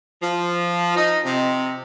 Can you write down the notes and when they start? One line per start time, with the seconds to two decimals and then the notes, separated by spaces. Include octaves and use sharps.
0.22 F3
0.96 D#4
1.25 C3